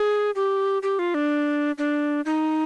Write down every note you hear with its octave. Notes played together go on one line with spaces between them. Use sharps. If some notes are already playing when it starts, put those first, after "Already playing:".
Already playing: G#4
G4
G4
F4
D4
D4
D#4